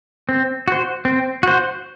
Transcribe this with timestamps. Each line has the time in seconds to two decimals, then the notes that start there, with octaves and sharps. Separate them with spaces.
0.29 C4
0.68 F#4 C5
1.05 C4
1.43 F#4 C5